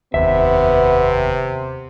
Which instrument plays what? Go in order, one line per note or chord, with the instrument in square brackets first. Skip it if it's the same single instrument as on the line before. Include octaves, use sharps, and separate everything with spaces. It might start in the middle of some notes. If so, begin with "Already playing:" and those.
[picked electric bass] F1 D#2 [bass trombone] C3 [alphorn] B3 [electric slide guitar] E5